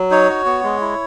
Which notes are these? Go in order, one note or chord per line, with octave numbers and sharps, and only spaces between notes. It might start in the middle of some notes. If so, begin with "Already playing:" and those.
Already playing: F#3
D#4 C#5
F#4
B3
G#3
E4